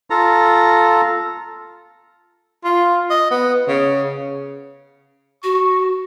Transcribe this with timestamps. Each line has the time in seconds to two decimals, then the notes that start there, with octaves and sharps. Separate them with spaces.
0.10 F4 A4 A#5
2.64 F4
3.10 D#5
3.30 B3
3.67 C#3
5.43 F#4 C#6